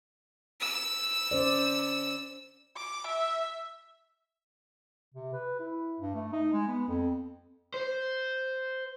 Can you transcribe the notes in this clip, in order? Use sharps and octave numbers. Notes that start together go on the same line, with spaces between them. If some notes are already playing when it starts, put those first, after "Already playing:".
E6
C#4 C5 D5
D6
E5
C3
B4
E4
G2
A3
D#4
G#3
B3
F2
C5